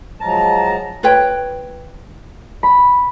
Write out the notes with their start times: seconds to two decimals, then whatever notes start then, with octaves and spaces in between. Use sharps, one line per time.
0.21 F3 F#3 G#3 A5 A#5
1.03 F4 B4 C#5 G5
2.63 B5